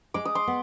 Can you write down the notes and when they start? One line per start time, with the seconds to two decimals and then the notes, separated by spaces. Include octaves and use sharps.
0.14 G#3 D6
0.25 D#6
0.35 C6 D6
0.47 B3